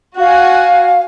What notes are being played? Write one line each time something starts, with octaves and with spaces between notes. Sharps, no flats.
F#4 F5 G#5